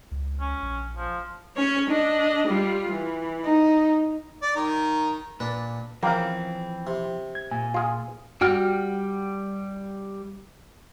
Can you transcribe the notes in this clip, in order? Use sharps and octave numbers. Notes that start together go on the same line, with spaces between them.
C#2
C#4
A#1
F3
C#4 C#5
D4 D#5
G3 F4
E3
D#4
D5
D#3 A#5
A#2 D4 B4
C#3 E3 F3 A#3 C4 F5 G5
C3
G#6
A#2 G#5
F4 G#4
G3 F#4 G5 F6